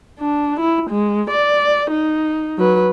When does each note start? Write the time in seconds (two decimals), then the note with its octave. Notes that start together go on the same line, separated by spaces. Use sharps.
0.20 D4
0.60 E4
0.90 G#3
1.30 D5
1.91 D#4
2.58 F#3 B4